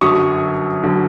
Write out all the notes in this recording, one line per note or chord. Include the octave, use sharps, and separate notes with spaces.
G1 F#2 D3 F#3 C#6 D#6
G1 D3 F#3